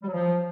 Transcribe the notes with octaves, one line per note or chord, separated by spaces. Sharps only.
G3
F#3
F3